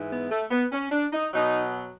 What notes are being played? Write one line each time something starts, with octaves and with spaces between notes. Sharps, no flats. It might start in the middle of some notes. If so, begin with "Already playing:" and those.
Already playing: G#2 E3
B3
A3
B3
C#4
D4
D#4
B2 F#3 D#4